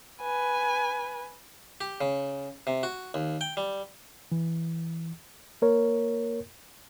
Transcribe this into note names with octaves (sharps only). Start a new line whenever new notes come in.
B4 G#5
G4
C#3
C3
F#4
D#2
G5
G3
E3
A#3 A#4 C#5